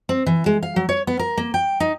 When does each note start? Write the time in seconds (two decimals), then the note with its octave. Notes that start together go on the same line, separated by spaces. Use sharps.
0.09 C4
0.26 E3
0.46 G#3
0.62 F5
0.76 F#3
0.89 C#5
1.07 B3
1.19 A#4
1.37 A#3
1.54 G5
1.80 D#4